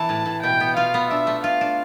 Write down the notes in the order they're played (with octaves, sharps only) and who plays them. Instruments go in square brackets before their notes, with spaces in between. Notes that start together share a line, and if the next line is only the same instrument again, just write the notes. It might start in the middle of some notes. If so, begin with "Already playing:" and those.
Already playing: [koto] E3 [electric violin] A5
[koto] A2
A2
[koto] B2 [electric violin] G5
[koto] B3
[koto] F4 [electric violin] F5
[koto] B3
[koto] D4 [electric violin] E5
[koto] A3
[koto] F4 [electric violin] F5
[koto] D4